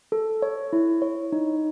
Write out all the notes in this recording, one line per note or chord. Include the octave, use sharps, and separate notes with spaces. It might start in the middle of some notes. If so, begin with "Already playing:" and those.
A4
C#5
E4
C#5
D#4